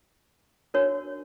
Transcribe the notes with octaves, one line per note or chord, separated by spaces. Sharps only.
D4 F#4 A#4 C#5